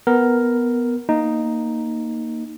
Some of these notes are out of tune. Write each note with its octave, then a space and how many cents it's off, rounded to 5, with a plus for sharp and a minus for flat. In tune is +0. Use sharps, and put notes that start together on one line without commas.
B3 +0 A#4 +0
A#3 +0 D#4 +0